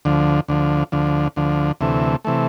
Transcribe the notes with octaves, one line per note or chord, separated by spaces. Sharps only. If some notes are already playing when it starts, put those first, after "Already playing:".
D2 D3 F3
D2 D3 F3
D2 D3 F3
D2 D3 F3
D2 C3 E3 A3
C3 E3 A3